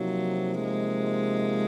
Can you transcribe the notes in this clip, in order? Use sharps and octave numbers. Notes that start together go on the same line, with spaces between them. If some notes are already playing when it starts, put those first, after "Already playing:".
Already playing: C3 F3 F#3 A#3 D#4
G#3